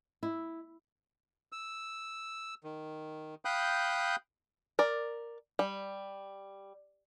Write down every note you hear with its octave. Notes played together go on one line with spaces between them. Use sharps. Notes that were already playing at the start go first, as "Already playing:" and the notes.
E4
E6
D#3
F5 G5 B5 D#6 F#6 G6
A#4 D5
G3